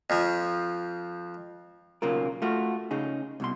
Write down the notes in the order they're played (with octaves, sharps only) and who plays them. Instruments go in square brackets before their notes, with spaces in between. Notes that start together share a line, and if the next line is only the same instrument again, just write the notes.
[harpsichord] F2 F3
[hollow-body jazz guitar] B1 C#3 A#3 F4 A#4
A3 F4 F#4
C#3 D#4 G#4
C2 B2 C6